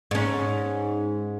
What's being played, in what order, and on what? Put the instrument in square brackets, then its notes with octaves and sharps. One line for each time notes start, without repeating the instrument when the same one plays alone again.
[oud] G#2 C#4